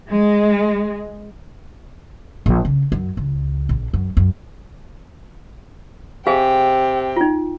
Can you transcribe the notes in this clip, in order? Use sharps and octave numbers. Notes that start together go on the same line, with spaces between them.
G#3
A#1
C#3
F#2
C#2
A#1
F#2
F#2
C3 G#4 F5 G5 G#5
D#4 F4